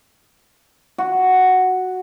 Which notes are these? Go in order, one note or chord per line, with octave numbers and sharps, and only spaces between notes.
F#4